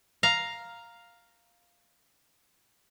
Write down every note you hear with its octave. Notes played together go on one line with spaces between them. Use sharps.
F5 A#5